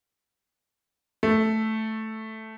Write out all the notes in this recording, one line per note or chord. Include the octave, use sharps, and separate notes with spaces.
A3